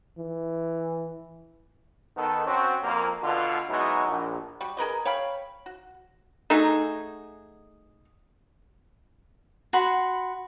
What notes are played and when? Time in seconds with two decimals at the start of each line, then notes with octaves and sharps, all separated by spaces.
0.18 E3
2.17 D#3 B3 A4
2.47 C4 C#4 F#4
2.83 F2 A#3
3.22 B2 D3 F4
3.70 F#3 G#3 B3 D#4 E4 F#4
4.07 A#1
4.60 G3 F#4
4.77 G#4 A#4 B4 D#5
5.05 C#5 F5 G5 B5
5.66 F#4
6.50 A3 D#4 F#4 G#4
9.73 F#4 F#5 B5 C6